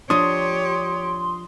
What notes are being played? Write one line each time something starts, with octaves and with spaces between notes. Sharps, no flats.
F3 D4 G4 C#5 C6 D#6